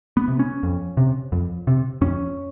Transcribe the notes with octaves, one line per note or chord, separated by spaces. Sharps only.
B3
C3
C#4
F2
C3
F2
C3
F2 C#4